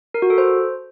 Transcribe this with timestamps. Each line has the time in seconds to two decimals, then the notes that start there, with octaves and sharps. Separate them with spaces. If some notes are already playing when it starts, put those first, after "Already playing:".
0.14 A#4
0.22 F#4
0.30 A4
0.38 C5